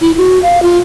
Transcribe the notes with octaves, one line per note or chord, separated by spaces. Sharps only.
E4
F#4
F5
F4